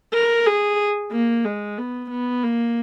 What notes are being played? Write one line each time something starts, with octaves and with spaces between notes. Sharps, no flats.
A#4
G#4
A#3
G#3
B3
B3
A#3